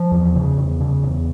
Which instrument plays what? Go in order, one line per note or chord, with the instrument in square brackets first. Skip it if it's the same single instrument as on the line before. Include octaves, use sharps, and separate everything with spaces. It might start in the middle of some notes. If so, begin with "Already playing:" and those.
Already playing: [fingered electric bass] F3
E2
C#3
E2
C#3
E2